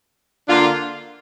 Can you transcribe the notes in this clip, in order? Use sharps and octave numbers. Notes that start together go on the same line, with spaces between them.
D3 A#3 D4 F4